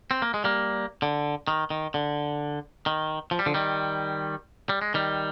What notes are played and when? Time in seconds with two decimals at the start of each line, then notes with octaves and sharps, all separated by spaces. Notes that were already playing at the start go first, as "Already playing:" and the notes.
0.11 C4
0.22 A#3
0.34 G#3
0.44 G3 A#3
1.02 D3
1.48 D#3
1.70 D#3
1.94 D3
2.86 D#3
3.31 F3
3.39 G3
3.46 D3 F3
3.54 D#3 G3
4.69 G3
4.82 G#3
4.94 D#3 G3